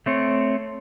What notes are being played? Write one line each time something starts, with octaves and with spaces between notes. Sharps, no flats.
A3 C4 C#5